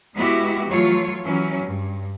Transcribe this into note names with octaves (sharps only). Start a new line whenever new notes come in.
G#3 B3 E4 F#4 G4
E3 F#3 A3 F4 C#5
E3 F#3 C#4
G2